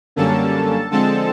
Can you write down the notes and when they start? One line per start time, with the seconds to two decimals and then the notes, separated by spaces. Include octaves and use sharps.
0.16 F#2 D3 G3 A#3 C#4 A4 A5
0.91 D3 F3 G#3 C4 A4 A5